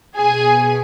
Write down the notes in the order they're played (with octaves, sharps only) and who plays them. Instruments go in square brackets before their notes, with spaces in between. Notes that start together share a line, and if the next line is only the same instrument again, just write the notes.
[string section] B2 G#4 G#5